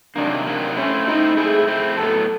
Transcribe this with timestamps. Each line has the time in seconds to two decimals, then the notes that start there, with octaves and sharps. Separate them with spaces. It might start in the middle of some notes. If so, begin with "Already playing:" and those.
0.16 C3 D#3 F#3 A#3 D4
0.46 C3 D#3 F#3 A#3
0.76 A3 C4 C#4 E4
1.07 A3 C4 D#4 E4
1.37 A3 C4 E4 G#4
1.67 A3 C4 E4
1.97 A2 F#3 B3 A4